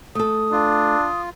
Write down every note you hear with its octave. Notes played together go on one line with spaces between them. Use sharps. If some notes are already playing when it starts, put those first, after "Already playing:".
A3 A4 D#6
D4 F4